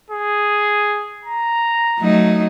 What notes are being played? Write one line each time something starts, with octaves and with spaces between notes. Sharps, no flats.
G#4
A#5
F#3 A3 D#4